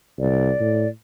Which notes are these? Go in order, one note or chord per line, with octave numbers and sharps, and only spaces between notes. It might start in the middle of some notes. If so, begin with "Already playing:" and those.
C2 D5
A2